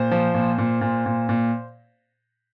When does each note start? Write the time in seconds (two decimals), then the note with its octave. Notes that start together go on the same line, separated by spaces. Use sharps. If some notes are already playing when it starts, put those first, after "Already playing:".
Already playing: A#2 C5
0.11 F3
0.34 A#2
0.58 A#2
0.81 A#2
1.06 A#2
1.29 A#2